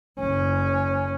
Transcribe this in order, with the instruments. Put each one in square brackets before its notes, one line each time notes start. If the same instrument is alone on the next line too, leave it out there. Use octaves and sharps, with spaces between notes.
[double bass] F#1 C#4